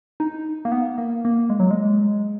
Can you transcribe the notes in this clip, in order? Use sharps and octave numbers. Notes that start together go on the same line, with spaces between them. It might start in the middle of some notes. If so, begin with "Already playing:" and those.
D#4
A#3
B3
A#3
A#3
G#3
F#3
G#3